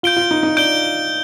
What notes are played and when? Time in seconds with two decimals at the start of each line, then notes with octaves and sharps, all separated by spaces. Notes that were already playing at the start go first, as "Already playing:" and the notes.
0.03 F4 G6 D7 G7
0.17 F4
0.31 D#4
0.43 D#4
0.57 D4 G6 D7 G7